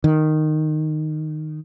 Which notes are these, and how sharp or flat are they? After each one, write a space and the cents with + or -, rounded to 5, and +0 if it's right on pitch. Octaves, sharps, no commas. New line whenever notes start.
D#3 -10